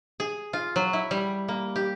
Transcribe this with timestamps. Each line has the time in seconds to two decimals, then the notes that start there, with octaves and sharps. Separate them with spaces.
0.20 G#4
0.53 F4
0.76 F#3
0.93 E4
1.11 G3
1.48 A#3
1.76 G4